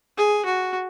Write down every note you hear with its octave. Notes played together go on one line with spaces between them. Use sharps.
G#4
F#4